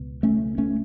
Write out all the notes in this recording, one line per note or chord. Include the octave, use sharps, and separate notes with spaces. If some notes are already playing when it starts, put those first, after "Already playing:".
Already playing: C#2 B2
A3 C#4
A3 C#4